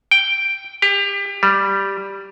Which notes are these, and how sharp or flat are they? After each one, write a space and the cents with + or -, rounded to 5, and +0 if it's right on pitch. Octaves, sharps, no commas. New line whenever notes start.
G5 +0
G4 +30
G3 +0